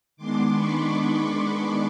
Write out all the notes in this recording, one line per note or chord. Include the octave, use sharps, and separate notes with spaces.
D#3 G#3 B3 D4 C6 D6
B5 C#6
C6 D6